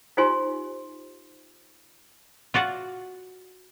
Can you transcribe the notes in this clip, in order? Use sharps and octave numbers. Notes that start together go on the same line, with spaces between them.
D#4 F4 G4 C5 G#5 C6
F4 F#4 D5 F#5